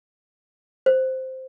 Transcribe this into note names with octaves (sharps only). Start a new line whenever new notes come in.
C5